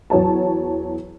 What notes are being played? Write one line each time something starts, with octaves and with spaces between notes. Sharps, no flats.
E2 F#3 C#5 A5